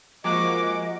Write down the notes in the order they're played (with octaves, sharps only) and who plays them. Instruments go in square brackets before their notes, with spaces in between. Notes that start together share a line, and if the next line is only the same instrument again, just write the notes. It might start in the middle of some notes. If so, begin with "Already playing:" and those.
[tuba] F3 [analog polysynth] G#3 A#3 F#4 [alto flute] D#5 [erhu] D6